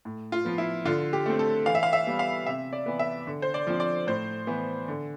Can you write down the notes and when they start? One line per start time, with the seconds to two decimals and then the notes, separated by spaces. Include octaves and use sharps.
0.05 A2
0.32 F4
0.45 F3 B3
0.58 E4
0.85 D3 F4
1.13 G4
1.26 A3 C4
1.39 A4
1.66 E3 F5
1.75 E5
1.83 F5
1.93 E5
2.07 G3 B3
2.19 F5
2.46 C3 E5
2.73 D5
2.86 E3 B3
2.99 E5
3.27 D3
3.42 C5
3.54 D5
3.67 F3 C4
3.80 D5
4.07 A2 C5
4.47 E3 B3
4.88 D3